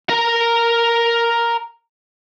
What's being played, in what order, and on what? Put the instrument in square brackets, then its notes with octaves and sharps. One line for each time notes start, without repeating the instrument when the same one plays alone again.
[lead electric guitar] A#4 A#5